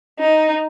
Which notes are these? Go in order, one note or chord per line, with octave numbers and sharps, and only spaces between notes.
D#4